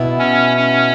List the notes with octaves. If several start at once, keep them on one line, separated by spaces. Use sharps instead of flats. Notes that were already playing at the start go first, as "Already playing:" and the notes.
Already playing: B2 B3 E4
C#4
C#4